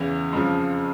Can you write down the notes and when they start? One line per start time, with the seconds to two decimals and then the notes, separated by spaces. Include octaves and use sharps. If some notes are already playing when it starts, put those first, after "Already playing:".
Already playing: E2 C#3 E3
0.33 F2 C#3 F3